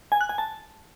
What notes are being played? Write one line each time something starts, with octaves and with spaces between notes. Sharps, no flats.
G#5
F#6
G#5
A5